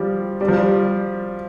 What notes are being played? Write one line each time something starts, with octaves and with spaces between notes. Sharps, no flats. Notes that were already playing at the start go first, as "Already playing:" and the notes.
Already playing: F3 G3
G3
F3
G3